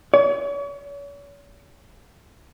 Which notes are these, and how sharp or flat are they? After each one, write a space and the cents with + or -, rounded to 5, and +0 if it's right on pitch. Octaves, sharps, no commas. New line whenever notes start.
C#5 +40